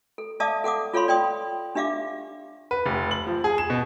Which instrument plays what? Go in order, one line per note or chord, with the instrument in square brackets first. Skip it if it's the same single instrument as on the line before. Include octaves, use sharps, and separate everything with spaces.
[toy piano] A4
D5 E5 F5 A5 D6 D#6
A4 F#5 D6 D#6
F4 A4 C#5 F5 B5 C6
D5 G5 C6 D#6
D4 G4 E5 F5 D6
[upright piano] B4
F1
F#7
F3
G#4
E7
B2